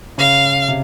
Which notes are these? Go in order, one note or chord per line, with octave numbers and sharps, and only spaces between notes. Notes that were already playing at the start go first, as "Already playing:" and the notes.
C#3 F5
C3